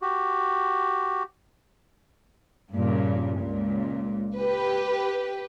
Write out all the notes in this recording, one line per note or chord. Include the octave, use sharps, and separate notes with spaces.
F#4 G4
G2 A#2 C#3
C#2 A#2
G4 B4